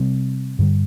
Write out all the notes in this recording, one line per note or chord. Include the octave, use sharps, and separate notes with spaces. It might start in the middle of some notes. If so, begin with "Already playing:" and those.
Already playing: C3 G3 C4
G2 D3 G3